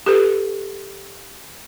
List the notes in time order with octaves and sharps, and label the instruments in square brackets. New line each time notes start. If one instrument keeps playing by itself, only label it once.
[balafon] G4 A4 B4